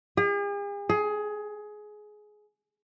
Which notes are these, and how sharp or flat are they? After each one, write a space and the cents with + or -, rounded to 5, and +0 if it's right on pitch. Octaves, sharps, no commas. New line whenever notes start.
G#4 -45
G#4 +20